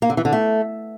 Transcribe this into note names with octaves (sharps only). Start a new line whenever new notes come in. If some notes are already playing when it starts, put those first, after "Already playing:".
A#3
D3
E3
D3
A3